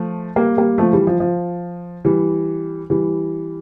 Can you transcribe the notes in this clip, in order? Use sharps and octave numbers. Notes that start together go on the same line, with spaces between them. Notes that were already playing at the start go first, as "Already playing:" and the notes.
Already playing: F3 A3
G3 A#3
G3 A#3
F3 A3
E3 G3
F3
F3
E3 G3
E3 G3